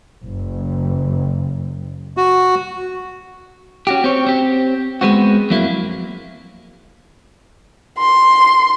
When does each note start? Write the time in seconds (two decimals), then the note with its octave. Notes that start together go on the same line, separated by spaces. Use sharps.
0.24 F#1
2.17 F#4
3.87 C#4 F#4 G4
4.04 C4 C#5
4.27 C4 G4
5.01 G#3 B3 C4 F#4
5.50 F2 F#3 A#3 E4
7.99 C6